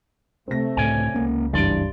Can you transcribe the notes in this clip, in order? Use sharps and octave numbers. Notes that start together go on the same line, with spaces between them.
C3 A3 C4 A#6
C#2 A2 C#5 D5 G#5
C#2 A#3 C#4
F#1 G2 E3 D5 C6 D7